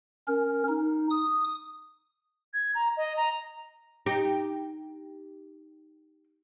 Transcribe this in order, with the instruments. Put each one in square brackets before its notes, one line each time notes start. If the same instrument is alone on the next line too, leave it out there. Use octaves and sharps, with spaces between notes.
[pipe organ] C#4 A#4
D#4
D#6
[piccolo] G#6
A#5
D#5
A#5
[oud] D#4 G4